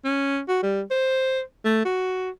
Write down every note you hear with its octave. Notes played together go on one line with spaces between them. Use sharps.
C#4
F#4
G3
C5
A3
F#4